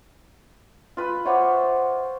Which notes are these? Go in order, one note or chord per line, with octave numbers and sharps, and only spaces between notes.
F4 B4
C5 C#5 E5 F#5 D6